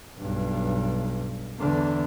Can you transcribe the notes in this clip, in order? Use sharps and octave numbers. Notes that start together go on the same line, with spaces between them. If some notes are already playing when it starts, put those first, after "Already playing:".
B1 G2
E2 D3